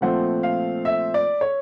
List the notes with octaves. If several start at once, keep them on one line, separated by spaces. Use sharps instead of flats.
A#2 F3 A3 C4 F#5
F5
E5
D5
C#5